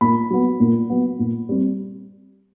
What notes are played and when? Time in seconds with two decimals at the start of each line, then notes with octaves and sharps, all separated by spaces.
0.01 A#2 B5
0.30 F#3 B3
0.60 A#2
0.90 F#3 B3
1.19 A#2
1.49 G3 C4